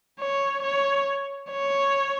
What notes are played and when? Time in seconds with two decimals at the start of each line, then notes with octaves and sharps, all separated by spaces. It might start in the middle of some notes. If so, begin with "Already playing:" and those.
0.20 C#5
0.63 C#5
1.52 C#5